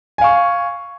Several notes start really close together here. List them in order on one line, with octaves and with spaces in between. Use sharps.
G#5 F5 C#6